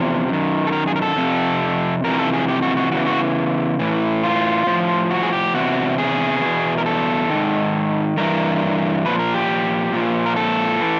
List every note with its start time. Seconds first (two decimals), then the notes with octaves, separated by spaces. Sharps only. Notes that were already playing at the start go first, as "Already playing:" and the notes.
Already playing: E2 C3 F3
0.28 F#2 D#3
0.67 A4
0.72 A#4
0.87 G#4
0.96 A#4
1.02 A4
1.17 F2 C3
2.04 F2 C3 E3 A#4
2.19 A4
2.33 G#4
2.48 G4
2.62 F#4
2.77 F#4
2.91 E2 C#3 E3 F#4
3.06 F#4
3.79 A2 E3
4.23 F4
4.67 A2 F3
5.11 F#4
5.23 G#4
5.32 G4
5.54 E2 C3 F#4
5.98 G#4
6.42 E2 B2
6.78 A#4
6.86 A4
7.30 G#2 D#3
8.17 G2 E3 A#4
9.05 A#2 F3 B4
9.19 A#4
9.34 G4
9.93 A#2 F3
10.26 A#4
10.36 A4
10.81 E3